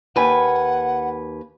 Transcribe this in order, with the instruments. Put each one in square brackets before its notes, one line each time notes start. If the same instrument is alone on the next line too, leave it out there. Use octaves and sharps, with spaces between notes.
[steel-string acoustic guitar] D#2 B4 G#5 [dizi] F#5